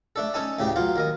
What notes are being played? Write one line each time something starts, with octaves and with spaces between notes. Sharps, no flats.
A3 D4 A4
C#4 D#4 A4 G#5 A5
D2 A2 C#3 G4
B1 F#3 F4
D#2 A#4 D#5